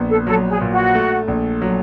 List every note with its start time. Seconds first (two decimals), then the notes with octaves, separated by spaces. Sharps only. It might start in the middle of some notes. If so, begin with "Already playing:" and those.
Already playing: A#1 B3
0.10 A4
0.27 F#3 A4
0.50 G#4
0.61 A#2
0.72 F#4
0.95 A3
1.28 A#1
1.62 F#3